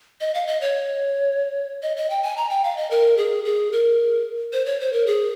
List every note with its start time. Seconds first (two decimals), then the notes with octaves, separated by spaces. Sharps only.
0.21 D#5
0.34 F5
0.47 D#5
0.61 C#5
1.83 D#5
1.97 D#5
2.10 G5
2.23 G#5
2.37 A#5
2.50 G5
2.64 F5
2.77 D#5
2.91 A#4
3.17 G#4
3.45 G#4
3.72 A#4
4.53 C5
4.66 C#5
4.80 C5
4.93 A#4
5.07 G#4